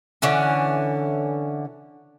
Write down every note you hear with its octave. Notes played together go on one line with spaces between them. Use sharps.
D3 E3 C#4